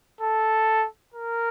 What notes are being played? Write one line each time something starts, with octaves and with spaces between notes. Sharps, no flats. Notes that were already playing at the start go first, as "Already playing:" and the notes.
A4
A#4